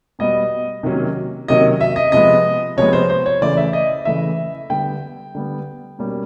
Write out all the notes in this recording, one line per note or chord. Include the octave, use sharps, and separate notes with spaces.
B2 G3 B3 D#5
C3 D#3 F#3 A#3 C#4
C3 D#3 F#3 A#3 C#4 D#5
E5
D#5
C3 F3 G#3 B3 D#5
C3 F3 G#3 B3 C#5
C5
C5
C#5
C#3 E3 A3 D5
E5
D#5
C#3 E3 A3 E5
D3 G3 B3 G5
D3 G3 B3
B2 G3 A#3 C#4